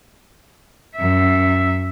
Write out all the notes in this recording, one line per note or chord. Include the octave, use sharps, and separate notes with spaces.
F#2 E5